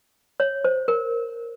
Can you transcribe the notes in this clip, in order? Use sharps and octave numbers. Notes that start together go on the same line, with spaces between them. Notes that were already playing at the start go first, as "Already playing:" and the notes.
C#5
C5
A#4